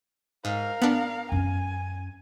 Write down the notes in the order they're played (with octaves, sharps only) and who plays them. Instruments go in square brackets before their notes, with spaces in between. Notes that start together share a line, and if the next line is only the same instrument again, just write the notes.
[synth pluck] G#2 [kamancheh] A#4 F5
[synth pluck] B3 D4
[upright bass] F#2 C#4 [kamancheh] G#5